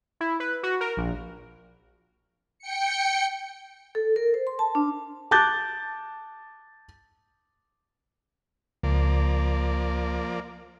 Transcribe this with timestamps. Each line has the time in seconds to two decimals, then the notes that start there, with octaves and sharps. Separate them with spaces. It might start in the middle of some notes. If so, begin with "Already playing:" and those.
0.21 E4
0.40 B4
0.63 F#4
0.81 A#4
0.97 A#1
2.59 G5 C#7
3.95 A4
4.16 A#4
4.34 C5
4.47 C6
4.59 A5
4.75 D4
5.31 A5 D6 F#6 G6 A6
8.83 C#2 F3 A#3 D5